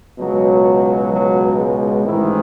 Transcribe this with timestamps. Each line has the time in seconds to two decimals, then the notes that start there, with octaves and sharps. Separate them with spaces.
0.19 C#2 B2 F#3
1.12 F#3
1.58 G#3
2.04 A1 G#2 D#3 E4